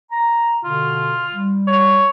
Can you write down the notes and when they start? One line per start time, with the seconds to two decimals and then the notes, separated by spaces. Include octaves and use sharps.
0.12 A#5
0.64 B2 D3 F4
1.33 G3
1.67 C#5